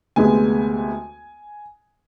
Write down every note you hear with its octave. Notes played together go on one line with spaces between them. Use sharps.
D2 C3 G#3 B3 G#5